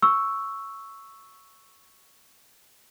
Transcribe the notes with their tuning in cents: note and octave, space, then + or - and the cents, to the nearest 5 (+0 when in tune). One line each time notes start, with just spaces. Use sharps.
C#6 +0 E6 +0